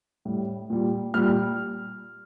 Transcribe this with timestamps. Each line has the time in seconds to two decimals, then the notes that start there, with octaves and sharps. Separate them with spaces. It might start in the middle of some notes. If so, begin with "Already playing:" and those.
0.25 A2 G3
0.70 A#2 G3
1.14 A#2 G3 F6